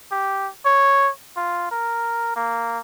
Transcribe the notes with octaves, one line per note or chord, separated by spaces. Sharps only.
G4
C#5
F4
A#4
A#3